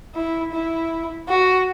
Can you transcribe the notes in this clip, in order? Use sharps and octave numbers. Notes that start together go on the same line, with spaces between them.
E4
E4
F#4